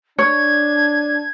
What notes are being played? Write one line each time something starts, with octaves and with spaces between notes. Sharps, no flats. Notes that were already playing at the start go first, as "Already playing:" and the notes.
D4 C#5 G#6